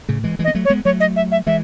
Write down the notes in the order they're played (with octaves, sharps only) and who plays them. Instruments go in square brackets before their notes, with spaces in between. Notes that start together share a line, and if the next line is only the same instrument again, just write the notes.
[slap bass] A2 C#3
E3 G#3
E3 G#3
[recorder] D#5
[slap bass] B3
F#3 A3
[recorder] C#5
[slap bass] G#3 B3
[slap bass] F#3 A3 [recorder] C#5
[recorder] D#5
E5
E5
[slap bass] E3 G#3 [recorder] E5